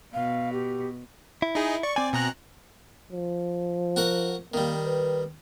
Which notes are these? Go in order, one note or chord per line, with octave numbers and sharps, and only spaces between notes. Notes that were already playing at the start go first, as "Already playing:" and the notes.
B2 F5
G4
E4
D#4 G#4
D5 C#6
C4 D5 G#5
B2 A#5 F#6
F3
F#4 A#4 F#5
D#3 G3 A#3
B4